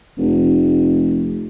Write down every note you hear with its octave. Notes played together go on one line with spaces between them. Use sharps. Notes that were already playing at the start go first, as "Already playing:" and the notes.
F1